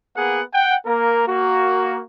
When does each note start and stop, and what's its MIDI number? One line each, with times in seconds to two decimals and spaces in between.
0.16 0.42 58
0.16 0.42 59
0.16 0.42 68
0.16 0.42 78
0.54 0.77 78
0.54 0.77 79
0.86 1.22 58
0.86 1.22 70
1.27 2.02 58
1.27 2.02 66